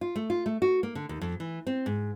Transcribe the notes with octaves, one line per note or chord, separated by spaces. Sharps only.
F4
A3
F4
A3
F#4
A#3
D3
D#2
F2
E3
C4
G#2